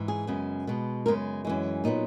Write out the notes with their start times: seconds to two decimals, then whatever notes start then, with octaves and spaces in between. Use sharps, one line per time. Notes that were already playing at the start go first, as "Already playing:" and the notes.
Already playing: G#2 E3
0.08 G#4
0.27 F#2 C#3 G#3 B3
0.67 B2 G#3 B3
1.06 F#2 C#3 G#3 B3 A#4
1.45 F#2 E3 G#3
1.84 A#2 F#3 B3 D#4